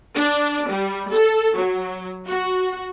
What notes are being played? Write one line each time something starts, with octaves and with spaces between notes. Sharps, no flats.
D4
G3
A4
F#3
F#4